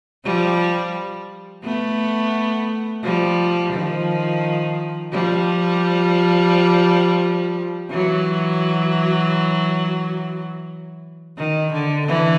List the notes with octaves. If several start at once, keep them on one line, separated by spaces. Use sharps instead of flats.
F3 G3
A3 B3
F3 G3
D#3 F3
F3 G3
E3 F#3
D#3
D3
D3 E3